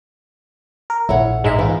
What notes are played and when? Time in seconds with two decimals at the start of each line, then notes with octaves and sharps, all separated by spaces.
0.90 A#4
1.09 A#1 E4 A4 C#5 F#5
1.44 G#2 G#3 D#4 E5
1.59 E3 B3 D#4 F4